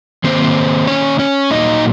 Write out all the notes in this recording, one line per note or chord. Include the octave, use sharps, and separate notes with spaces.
D#3 A#3 C4 C5
C#4 C#5
C#4 C#5
A#2 F#3 A#3 D#4 D#5